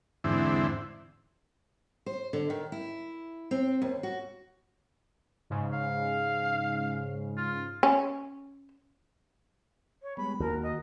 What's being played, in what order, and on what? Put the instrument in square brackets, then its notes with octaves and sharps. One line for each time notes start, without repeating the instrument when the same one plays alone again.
[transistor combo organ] E2 G#2 D3 C4 E4
[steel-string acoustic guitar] C5
D3
D#3
E4
C4
D#2
F#4
[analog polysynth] G#2 C#3
[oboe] F5
F4
[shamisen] C#4
[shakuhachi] C#5
[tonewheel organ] G3 G#3 B3 [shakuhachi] B5
[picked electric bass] D#2 [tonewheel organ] F#4 [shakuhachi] A#4
[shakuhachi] D#5